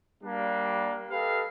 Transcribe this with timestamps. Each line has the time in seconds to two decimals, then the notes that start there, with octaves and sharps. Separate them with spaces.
0.23 G3 A#3 D4
1.10 G4 A4 B4 D#5 F5